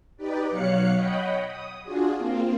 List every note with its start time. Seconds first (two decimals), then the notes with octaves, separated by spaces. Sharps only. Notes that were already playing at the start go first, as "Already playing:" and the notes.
0.17 D#4 G4 B4 D5
0.49 B2 F#3 C#5 F5 F#6 C#7
0.94 C#5 D#5 F#5 G5 B5
1.44 D#6
1.83 D4 F4 F#4 G#4
2.17 A#3 C4 F4